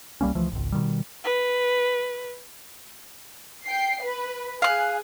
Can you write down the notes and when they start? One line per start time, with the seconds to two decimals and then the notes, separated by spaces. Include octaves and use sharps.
0.21 C2 G3 A#3 C#4
0.35 C#2 E3 F3 A3
0.52 G#1 C#2
0.72 B2 D#3 G3
1.24 B4
3.65 G5 C7
4.04 B4
4.62 G#4 F5 F#6